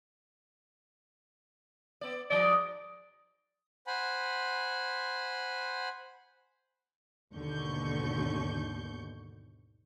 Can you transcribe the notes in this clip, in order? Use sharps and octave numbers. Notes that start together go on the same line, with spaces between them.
B3 D5
G#2 F3 D5 D#5
C5 F#5 G#5 B5
G#1 D#2 B2 D3 C#6 G6